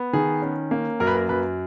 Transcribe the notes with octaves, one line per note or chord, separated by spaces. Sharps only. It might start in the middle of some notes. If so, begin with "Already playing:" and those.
Already playing: B3
D#3 G#4
C#4
A#3
F#2 A#4
B4
A#4
F#2 B4